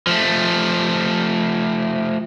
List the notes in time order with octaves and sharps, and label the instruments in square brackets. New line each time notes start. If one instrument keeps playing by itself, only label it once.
[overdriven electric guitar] F3 A3